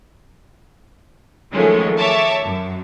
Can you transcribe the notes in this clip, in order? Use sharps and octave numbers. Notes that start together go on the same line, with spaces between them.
D#3 F3 F#3 G#3 A3 C#4
C#5 E5 A5 D6
F#2